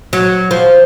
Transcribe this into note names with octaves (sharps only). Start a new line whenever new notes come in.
F#3
F3